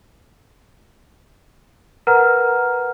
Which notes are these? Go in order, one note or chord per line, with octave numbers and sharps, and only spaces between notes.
A#4 B4 F#5 A#5 F6